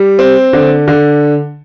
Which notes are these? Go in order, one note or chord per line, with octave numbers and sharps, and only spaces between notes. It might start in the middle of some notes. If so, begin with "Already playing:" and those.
Already playing: G3
C4
D3
D3